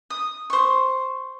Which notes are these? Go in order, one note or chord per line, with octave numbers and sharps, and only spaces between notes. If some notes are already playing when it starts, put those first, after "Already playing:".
D#6
C5 C#6